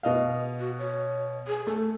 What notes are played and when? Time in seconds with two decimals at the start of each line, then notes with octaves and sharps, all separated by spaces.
0.03 B2 D#5 F5
0.60 F#4
0.78 C#5
1.47 G#4
1.67 A3 A4